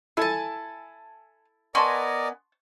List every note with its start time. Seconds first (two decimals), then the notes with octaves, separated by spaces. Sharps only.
0.17 E4 A4 G#5 A5
1.75 B3 A#4 D5 D#5 G#5 A5 C6 C#6